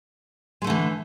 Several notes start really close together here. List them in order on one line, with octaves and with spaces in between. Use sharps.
G#3 A3 D3 E3